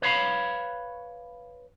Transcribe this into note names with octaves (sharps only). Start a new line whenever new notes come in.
B4 C#5 F5 B5